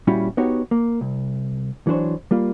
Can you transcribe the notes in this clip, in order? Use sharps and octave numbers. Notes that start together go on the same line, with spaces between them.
A#2 G3 C#4 E4 F#4
B3 D#4 F#4 G4 C#5
A#3
C2
E3 F#3 D4 C5 C#5
G3 A#3 F4